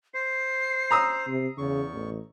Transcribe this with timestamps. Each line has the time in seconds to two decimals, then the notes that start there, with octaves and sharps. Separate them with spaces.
0.14 C5 C7
0.91 A#5 D#6 E6
1.27 C3
1.58 E2 C#3 C#6
1.94 A1